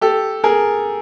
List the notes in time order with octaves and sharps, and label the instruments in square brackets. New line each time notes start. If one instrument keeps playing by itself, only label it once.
[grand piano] G4 A4
G#4 A#4